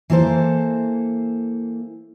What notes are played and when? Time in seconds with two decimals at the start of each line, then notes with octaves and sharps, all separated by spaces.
0.10 E3 A#3 A4 C5